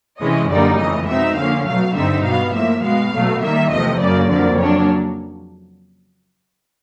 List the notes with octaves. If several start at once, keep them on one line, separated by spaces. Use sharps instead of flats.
C3 E3 G#3 C#4 D#5
F#2 D3 G3 A#3 D#4 D5
F2 C#3 E3 A3 D#5
B2 G#3 C4 D#4 E5
D3 F3 A#3 C#4 F5
B2 F#3 A3 F5
G2 D3 G3 C4 D#4 E5
B2 G3 B3 F5
A2 F3 A#3 E5
B2 G#3 B3 F5
B2 F#3 A3
D#3 G3 A#3 E5
E2 C3 F3 A3 D#5
F#2 C#3 F#3 A#3 D5
F2 D3 F#3 A#3 D5
C#3 F#3 A#3 D4 C#5